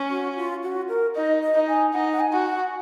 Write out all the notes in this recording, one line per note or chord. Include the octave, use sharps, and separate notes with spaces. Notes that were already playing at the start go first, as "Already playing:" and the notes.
Already playing: C#4
F#4
F4
F#4
A#4
D#4 D#5
D#5
D#4
G#5
D#4 F#5
F#5
G#5
F#4
F#5